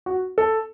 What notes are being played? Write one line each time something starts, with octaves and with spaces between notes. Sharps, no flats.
F#4
A4